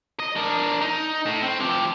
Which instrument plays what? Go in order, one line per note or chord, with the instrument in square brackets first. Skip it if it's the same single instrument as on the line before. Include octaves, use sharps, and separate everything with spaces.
[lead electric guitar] D#5
D4 A#4
D#4
A2
C4
F3 G4